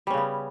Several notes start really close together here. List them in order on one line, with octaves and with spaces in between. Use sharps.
G3 C#4 C#3 B3